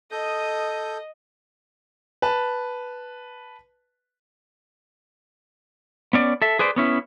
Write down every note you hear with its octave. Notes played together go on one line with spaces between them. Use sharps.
A4 D#5 D#6 G6
B4 A5
B3 C#4 D5
A4 E5
G#4 B4 C5 D5
B3 C#4 E4